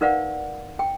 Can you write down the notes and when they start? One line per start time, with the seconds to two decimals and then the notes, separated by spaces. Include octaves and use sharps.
0.01 D#4 A#4 B4 D5 F5 F#5
0.79 G5